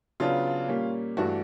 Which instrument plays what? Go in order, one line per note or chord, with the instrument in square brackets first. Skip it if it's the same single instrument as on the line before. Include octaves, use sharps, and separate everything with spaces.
[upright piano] C#3 F#3 B3 D4 F4
A#2 G3 A#3 C#4
G2 E3 A3 D4 F#4